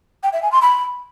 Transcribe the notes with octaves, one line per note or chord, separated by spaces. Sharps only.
G5
E5
G#5
C6
B5